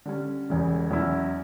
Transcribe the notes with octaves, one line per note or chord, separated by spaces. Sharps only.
D3 G3 C#4
E1 E2 C#3 G3
E2 B2 F#3 C#4 E4